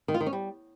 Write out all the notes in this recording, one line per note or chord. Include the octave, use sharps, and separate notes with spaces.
D#3
F4
D#3
C#4
G3